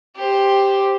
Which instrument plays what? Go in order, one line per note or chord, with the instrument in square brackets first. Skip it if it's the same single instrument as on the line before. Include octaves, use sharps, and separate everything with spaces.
[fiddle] G4 C5